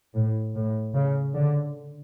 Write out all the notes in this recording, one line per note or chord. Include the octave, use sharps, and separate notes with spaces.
A2
A2
C#3
D3